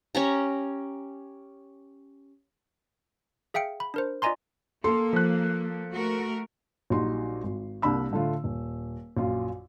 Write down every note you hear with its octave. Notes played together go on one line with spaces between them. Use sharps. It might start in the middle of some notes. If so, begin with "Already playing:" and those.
C#4 G4 A#5
G#4 E5 F5 G5 C#7
B5
D4 A#4 C5
F4 D5 D#5 G#5 A#5 C6
A#3 A4 C6
F3 F#6
A3 F#4 A#4
A#1 F#3 G3 D#4 F#4 C6
G#1
C2 A#3 D4 B5 E6
A2 D3 A3 F4
D#1
A#1 F#2 F4